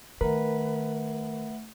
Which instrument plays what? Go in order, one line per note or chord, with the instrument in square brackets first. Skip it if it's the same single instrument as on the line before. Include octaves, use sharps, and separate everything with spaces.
[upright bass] D#3 [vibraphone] A3 E5 F#5 [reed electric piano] A#4 [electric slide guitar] B4